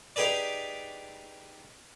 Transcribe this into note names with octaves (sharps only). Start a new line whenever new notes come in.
D#4 G4 G#4 B4 D5